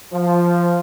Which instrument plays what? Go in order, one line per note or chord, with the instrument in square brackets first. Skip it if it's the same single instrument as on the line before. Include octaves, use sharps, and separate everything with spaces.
[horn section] F3